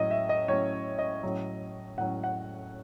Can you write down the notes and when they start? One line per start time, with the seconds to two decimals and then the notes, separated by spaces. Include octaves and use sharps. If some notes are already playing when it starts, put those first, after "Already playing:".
Already playing: A2 F#3 C#4 D#5
0.11 E5
0.29 D#5
0.48 A2 F#3 C#4 C#5
0.99 D#5
1.23 A2 F#3 C#4
1.98 A2 F#3 C#4 F#5
2.24 F#5